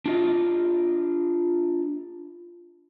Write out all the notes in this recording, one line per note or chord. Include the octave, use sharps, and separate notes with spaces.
D4 F4 D#5